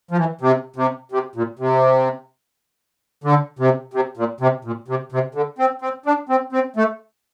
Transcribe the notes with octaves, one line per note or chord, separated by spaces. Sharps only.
F3
E3
C3
C3
C3
A#2
C3
D3
C3
C3
A#2
C3
A#2
C3
C3
D3
C4
C4
D4
C4
C4
A3